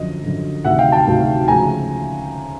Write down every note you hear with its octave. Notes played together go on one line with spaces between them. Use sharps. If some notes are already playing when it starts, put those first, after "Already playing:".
Already playing: F#2 D3 F3 D#5
F#2 D3 F3
D2 C3 D#3 F#3 E5 F#5
F5 G5
G5 A5
D2 C3 D#3 F#3
D2 C#3 F3 G#3 G#5 A#5